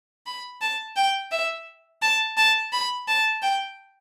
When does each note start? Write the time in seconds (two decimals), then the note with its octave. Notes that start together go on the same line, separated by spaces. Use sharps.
0.26 B5
0.61 A5
0.96 G5
1.32 E5
2.02 A5
2.37 A5
2.73 B5
3.08 A5
3.42 G5